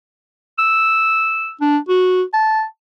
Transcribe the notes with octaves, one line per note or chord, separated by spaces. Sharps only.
E6
D4
F#4
A5